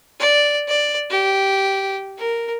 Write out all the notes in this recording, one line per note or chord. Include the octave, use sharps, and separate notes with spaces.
D5
D5
G4
A#4